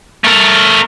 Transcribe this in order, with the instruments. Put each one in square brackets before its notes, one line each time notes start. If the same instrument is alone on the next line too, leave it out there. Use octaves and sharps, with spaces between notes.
[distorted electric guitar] A3 A#4